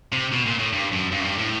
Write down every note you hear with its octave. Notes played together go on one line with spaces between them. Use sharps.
C3
B2
A#2
A2
G2
F#2
G2
F#2
G2
A2